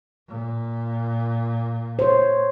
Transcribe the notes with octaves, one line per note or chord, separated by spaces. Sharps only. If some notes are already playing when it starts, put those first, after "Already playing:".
A#2
C5 C#5